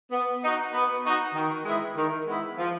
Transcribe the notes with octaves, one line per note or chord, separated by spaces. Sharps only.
B3
D#4 F#4
B3
D#4 F#4
D#3
G#3 B3 E4
D#3
G#3 B3 E4
F3